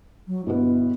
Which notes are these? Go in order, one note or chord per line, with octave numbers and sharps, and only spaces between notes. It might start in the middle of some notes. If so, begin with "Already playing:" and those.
F#3
G1 B2 B3 E4